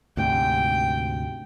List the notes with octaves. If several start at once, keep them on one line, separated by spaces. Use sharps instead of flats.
D2 G#2 C3 G5